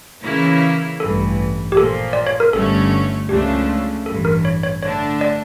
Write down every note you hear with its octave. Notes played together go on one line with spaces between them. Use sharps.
C#3 E3 A#3 E4
A1 G2 E3 A4
G4
A#2 F3 A#3 A4
D5
C#5
A#4
G1 G2 D3 A3 C#4 A4
C#2 C#3 F3 A3 D4 G4
A1 G2 E3 A4
A#4
C#5
C#5
D3 A3 D4 C#5
D5